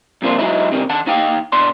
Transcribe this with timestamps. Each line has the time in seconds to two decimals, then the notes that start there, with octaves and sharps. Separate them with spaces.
0.22 G2 C3 F3 A#3 D4 F4
0.38 F#3 G#3 D#4 E4
0.72 C3 D#3 G3
0.90 D#3 F#5 A5
1.06 D#2 D#4 F5 G5
1.52 B2 D3 D4 C6